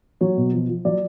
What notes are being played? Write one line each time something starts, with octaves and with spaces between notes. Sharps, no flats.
F#3 C#5
B2
F3
F3
F#3 D5